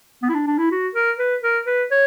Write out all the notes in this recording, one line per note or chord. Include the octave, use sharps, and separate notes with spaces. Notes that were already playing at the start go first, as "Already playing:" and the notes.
B3
E4
D4
D4
E4
F#4
A#4
B4
A#4
B4
C#5